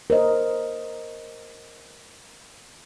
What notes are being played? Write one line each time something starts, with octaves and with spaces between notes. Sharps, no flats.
A#4 C5 D#5